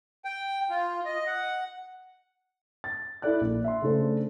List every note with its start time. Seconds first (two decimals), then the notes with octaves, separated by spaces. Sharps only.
0.25 G5
0.70 F4
1.05 D#5
1.27 F#5
2.84 A6
3.22 E4 A4 D5 F#6
3.41 A#1
3.64 E5 C6
3.82 C#3 A3 D4 A4 C5